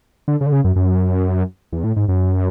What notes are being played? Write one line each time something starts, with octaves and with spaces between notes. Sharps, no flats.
D3
C#3
D3
C#3
F#2
F#2
E2
A2
G#2
F#2